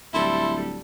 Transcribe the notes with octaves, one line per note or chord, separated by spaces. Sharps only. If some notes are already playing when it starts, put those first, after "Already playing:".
D1 G3 E4 A4 C6